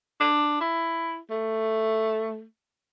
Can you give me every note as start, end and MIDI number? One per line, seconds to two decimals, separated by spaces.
0.21 0.58 62
0.61 1.18 64
1.30 2.43 57